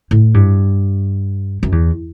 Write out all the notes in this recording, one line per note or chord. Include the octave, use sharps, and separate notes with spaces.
A2
G2
F#2
E2